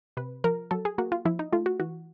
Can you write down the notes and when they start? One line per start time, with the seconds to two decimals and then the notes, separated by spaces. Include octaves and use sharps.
0.17 C3 B4
0.44 F3 A#4
0.71 F#3 A4
0.85 G#4
0.98 A#3 F#4
1.12 F4
1.25 F3 E4
1.39 D#4
1.52 A3 F4
1.66 F#4
1.80 E3 F#4